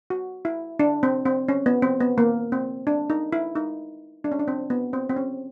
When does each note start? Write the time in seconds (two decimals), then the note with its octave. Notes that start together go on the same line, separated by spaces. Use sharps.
0.10 F#4
0.45 E4
0.79 D4
1.03 C4
1.26 C4
1.49 C#4
1.66 B3
1.82 C4
2.00 B3
2.18 A#3
2.52 C4
2.87 D4
3.10 D#4
3.33 E4
3.56 D#4
4.24 D4
4.32 C#4
4.39 D4
4.48 C4
4.70 B3
4.93 C4
5.09 C4
5.16 C#4